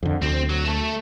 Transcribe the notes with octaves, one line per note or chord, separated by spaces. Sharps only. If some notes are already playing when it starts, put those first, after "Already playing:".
F2 D3
D2 C4
F#3
A3 A4